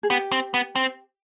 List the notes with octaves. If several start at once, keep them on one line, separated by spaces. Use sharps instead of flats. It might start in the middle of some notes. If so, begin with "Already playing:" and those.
G#4
B3 G4
C4
B3
C4